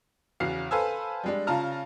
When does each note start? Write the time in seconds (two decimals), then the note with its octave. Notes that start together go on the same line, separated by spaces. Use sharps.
0.40 E2 C#3 F#4 F6 C7
0.71 A4 B4 C5 F5 G#5 E6
1.24 G3 G#3 D4
1.47 C#3 F4 A5 A#5 F6